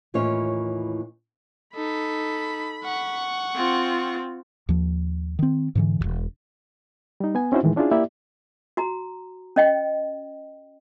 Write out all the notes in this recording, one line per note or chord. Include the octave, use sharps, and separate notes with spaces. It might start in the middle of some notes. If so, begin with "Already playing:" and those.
D#2 A2 E3 C#4 F4 C#5
D#4 A4 B5
F#5 C#6
C4 F4
D#2 F3
D#3 C4
G#2 D3 E3
E1 E2
G3 D#4
B3 G#5
C4 C#4 D#4 E4 F#4 C5
A2 D#3 E3 G#3
C#4 D4 E4 F4 G#4
A#3 E4 G4 D5 E5
F#4 A#5
C#4 D#5 G5